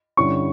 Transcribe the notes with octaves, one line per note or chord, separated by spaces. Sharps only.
G2 D3 G3 C#4 E4 C#6